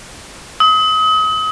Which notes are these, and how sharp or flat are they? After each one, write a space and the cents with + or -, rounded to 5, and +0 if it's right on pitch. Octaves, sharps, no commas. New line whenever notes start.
D#6 +35